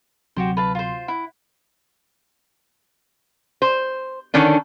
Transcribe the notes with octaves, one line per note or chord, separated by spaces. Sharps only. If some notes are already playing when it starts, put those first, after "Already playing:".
D2 C3 F#3 F#4 G4 C5
B4 F5 A5
F4 C5
E4 F#5
C5
D3 D#3 C#4 D4